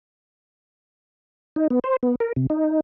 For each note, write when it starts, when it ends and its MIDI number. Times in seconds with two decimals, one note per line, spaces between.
1.56 1.67 63
1.70 1.79 59
1.84 1.96 72
2.03 2.15 59
2.20 2.33 70
2.36 2.47 48
2.50 2.80 63